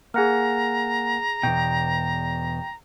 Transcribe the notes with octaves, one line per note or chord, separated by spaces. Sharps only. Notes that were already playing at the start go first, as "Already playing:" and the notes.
A#3 G#4 F#5 G#5 A#5 F6
E2 B2 G5